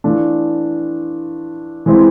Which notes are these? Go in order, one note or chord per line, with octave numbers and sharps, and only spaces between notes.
E3 A3 D4 F4
E3 G#3 C4 E4